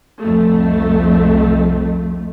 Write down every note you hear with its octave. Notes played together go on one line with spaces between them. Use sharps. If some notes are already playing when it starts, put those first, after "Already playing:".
C2 F2 A3